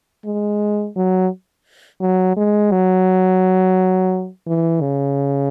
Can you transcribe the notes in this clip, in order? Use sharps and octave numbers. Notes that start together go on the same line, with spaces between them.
G#3
F#3
F#3
G#3
F#3
E3
C#3